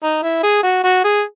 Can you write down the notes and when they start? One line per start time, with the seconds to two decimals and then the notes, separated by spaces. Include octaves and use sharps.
0.03 D#4
0.23 E4
0.43 G#4
0.63 F#4
0.84 F#4
1.04 G#4